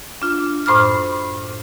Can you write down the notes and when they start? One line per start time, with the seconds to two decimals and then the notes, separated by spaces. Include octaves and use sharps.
0.22 D4 F4
0.66 F#2 A2 C5 B5 D6 F6